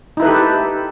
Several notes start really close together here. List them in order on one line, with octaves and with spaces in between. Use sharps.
D#4 E4 B4 A4 G4